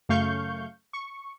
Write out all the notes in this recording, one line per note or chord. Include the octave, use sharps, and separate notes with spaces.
F#2 C#3 A3 F5 C#6 G6
C#6